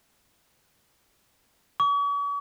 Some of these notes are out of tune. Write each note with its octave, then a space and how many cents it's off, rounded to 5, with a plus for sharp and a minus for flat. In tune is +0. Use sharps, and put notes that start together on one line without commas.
C#6 +45